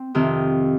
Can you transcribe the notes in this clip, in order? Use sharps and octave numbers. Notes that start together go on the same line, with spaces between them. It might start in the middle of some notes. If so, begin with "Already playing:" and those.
Already playing: C4
F2 C3 D#3